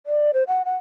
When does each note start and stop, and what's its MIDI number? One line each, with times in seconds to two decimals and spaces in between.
0.06 0.31 74
0.34 0.44 72
0.48 0.65 78
0.65 0.76 78